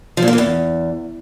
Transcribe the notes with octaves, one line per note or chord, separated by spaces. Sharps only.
F3
A#2
A#3
E3
E2